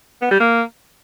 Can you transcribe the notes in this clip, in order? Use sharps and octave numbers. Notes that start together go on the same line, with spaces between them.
B3
G3
A#3